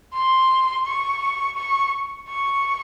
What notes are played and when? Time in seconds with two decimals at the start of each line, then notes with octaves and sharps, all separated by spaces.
0.13 C6
0.86 C#6
1.57 C#6
2.29 C#6